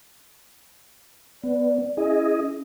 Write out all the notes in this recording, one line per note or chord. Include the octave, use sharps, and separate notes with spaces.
B3 D5
C#4 E4 G#4 D#5